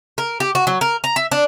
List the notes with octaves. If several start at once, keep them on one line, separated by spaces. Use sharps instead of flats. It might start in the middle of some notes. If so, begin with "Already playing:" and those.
A#4
G4
F#4
F#3
A#4
A#5
E5
D4